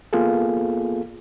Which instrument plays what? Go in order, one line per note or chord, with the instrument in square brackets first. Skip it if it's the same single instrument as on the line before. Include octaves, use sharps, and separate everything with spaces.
[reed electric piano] A#3 B3 F4 G#4 A4